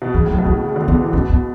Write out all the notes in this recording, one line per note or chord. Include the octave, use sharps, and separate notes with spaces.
B2
C#3 E3
A2 F#3
B2
G3
B2
C#3
D3
D3 B3
E3
B2 C#4
B3